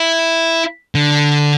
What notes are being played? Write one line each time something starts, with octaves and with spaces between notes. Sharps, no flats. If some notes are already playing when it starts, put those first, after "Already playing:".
Already playing: E4
D3